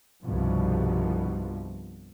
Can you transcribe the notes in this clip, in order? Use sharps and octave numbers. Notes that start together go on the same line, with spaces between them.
C2 G2 B2 F3